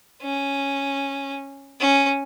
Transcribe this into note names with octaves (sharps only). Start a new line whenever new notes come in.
C#4
C#4